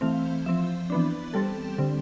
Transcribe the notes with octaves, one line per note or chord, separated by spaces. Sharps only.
E3 A3 C4 F5
F3 C4 E5
E3 B3 D4
G3 C4 A4
D3 G3 C4